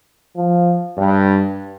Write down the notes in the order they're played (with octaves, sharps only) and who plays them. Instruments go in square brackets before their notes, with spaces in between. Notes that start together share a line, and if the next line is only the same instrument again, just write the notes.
[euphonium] F3
[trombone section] G2